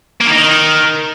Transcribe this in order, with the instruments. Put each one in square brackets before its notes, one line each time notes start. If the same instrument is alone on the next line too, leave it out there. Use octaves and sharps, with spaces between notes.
[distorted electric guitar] A#3
D#3
D#4
D#3